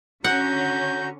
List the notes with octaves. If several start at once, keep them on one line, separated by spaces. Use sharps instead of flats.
D3 C#4 F#4 F#5 A#5 G6